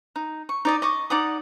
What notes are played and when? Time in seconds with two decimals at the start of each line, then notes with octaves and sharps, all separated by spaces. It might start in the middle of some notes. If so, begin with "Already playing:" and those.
0.16 D#4
0.49 C#6
0.65 D#4 D5 D#5
0.82 D#5 C#6 D6
1.10 D#4 D5 F#5 D#6